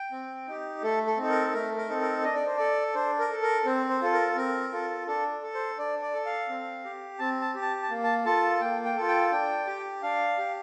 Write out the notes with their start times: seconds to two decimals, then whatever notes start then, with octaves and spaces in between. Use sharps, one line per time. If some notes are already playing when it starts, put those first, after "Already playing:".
Already playing: G5
0.12 C4
0.47 D#4 G4
0.83 A3 A4
1.07 A4
1.18 C4 D#4 A4
1.30 A#4
1.53 A3 A#4
1.77 A#4
1.89 C4 D#4 A4
2.01 A#4
2.24 D4 D#5
2.35 D5
2.46 C5
2.57 A4 D5
2.95 D4 C5
3.19 A#4
3.31 A4
3.42 A#4
3.65 C4 C5
3.89 C5
4.01 F4 A4
4.13 A#4
4.36 C4 A#4
4.72 F4 A4
5.07 D4 A4
5.42 A4
5.54 C5
5.78 D4 D5
6.02 D5
6.14 A4
6.25 F5
6.48 C4
6.84 G4
7.19 C4 A5
7.41 A5
7.55 G4
7.62 A5
7.83 A5
7.90 A#3
8.03 A5
8.25 F4 A4 A5
8.61 A#3 G5
8.85 G5
8.96 F4 A4
9.08 G5
9.31 D4 G5
9.67 G4
10.02 D4 F5
10.38 G4